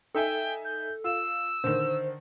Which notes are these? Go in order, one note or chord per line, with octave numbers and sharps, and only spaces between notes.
D#4 A4 E5 G5 G#5
G6
F4 E6
D3 D#3 C5